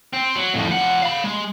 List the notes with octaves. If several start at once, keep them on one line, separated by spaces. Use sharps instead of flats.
C4
F#3
F2 A2
F3 F#5
F5 B5
G#3